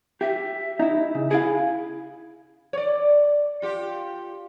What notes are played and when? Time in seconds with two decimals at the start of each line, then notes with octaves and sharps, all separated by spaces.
0.21 G4 E5
0.79 D#4 E4
1.15 C#3
1.31 E4 G#4 F5
2.73 C#5 D5
3.62 F4 G4